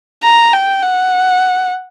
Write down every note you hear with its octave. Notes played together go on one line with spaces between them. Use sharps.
A#5
G5
F#5